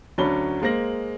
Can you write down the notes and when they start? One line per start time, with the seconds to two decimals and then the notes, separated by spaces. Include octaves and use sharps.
0.18 D2 F#3 C#4 D4 B5 G7
0.62 G#3 A#3 C5 A#6 F#7